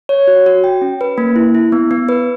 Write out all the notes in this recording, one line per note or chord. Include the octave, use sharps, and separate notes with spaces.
C#5
F#4
F#4
G5
C#4
B4
A#3
E4
E4
B3
B3
B4